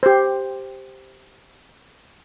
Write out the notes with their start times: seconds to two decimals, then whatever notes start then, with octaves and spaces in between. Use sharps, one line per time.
0.03 G4 C5